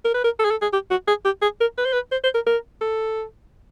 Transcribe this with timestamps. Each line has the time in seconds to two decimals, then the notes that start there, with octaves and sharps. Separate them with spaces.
0.05 A#4
0.14 B4
0.24 A#4
0.39 A4
0.45 G#4
0.51 A4
0.62 G#4
0.73 G4
0.90 F#4
1.08 G#4
1.25 G4
1.42 G#4
1.60 A#4
1.78 B4
1.85 C5
1.93 B4
2.12 C5
2.24 C5
2.35 A#4
2.46 A#4
2.81 A4